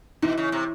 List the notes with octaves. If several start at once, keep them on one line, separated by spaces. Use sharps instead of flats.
B2 E3
C#3
C3